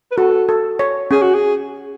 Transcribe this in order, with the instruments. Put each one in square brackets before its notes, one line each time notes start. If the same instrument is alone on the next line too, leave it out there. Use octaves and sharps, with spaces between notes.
[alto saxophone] B4
[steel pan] F#4 [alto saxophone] A4
[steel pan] A4
C#5
[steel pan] C#4 [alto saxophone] G#4
[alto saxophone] F#4
G#4